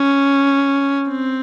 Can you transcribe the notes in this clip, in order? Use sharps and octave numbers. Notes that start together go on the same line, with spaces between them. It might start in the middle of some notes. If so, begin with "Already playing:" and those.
Already playing: C#4
C4